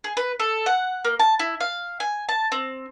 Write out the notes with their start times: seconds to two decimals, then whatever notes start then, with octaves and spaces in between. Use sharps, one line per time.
0.04 G#4
0.17 B4
0.40 A4
0.66 F#5
1.05 A#3
1.20 A5
1.39 E4
1.60 F5
2.00 G#5
2.29 A5
2.52 C4